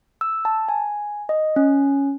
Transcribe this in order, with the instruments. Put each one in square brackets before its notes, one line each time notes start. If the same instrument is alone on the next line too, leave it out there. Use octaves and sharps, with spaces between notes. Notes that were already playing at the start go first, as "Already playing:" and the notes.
[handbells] E6
A5
G#5
D#5
C#4